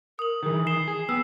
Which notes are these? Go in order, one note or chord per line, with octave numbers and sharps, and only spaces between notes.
A#4 D#6 F#7
D#3 E3 G#4
D#6 C7 E7 G7
G#4
B3 G5 E6